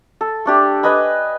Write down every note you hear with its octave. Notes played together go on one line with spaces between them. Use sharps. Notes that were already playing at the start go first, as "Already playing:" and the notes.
A4
A3 D4 G4
B4 D#5 G#5 B5